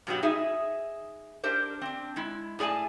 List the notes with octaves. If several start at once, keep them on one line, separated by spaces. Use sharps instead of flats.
G2 B2 F#3 B3 F#4 G4
D#4 G#4 E5
D4 G4 A#4 C5
C4 D4
G#3 E4
A2 G#4 D5 G#5 A5